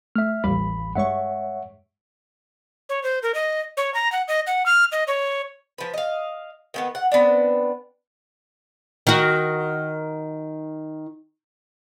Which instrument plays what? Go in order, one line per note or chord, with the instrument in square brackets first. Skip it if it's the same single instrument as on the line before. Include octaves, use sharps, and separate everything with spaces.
[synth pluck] A3 [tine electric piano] E5 F6
[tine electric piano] A1 B5 [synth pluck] D#2 G3 F5
[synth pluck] G2 G#3 C#6 [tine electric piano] C#5 E5 F#5
[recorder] C#5
C5
A#4
D#5
C#5
A#5
F#5
D#5
F#5
F6
D#5
C#5
[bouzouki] F3 B4
D#5 F5
D#3 A#3 B3
F#5
B3 C4 D4
[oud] D#3 F#4